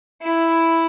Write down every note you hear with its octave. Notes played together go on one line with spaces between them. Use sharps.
E4